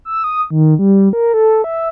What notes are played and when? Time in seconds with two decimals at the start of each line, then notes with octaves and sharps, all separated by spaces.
0.05 E6
0.24 D#6
0.50 D#3
0.79 G3
1.13 A#4
1.34 A4
1.64 E5